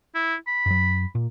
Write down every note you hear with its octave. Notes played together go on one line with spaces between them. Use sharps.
E4
B5
F#2 F#3
A#2